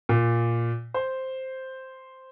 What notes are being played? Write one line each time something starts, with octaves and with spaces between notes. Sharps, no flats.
A#2
C5